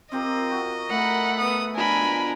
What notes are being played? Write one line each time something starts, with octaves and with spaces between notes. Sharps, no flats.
C4 F4 G4 A#4 D#5
F#4
A3 A#4 F#5 B5
B3 D#6
B2 F3 D4 A#4 G#5 B5